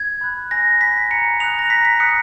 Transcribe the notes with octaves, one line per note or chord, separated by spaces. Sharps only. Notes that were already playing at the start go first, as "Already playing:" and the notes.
Already playing: G#6
B5 F#6
G#5 A#6
B5 F#6 B6
A#5 C#7
D#6 F#6 F7
A#6
A#5 B6
B6
D#6 F#6 C#7